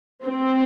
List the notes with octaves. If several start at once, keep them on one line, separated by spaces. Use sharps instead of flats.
C4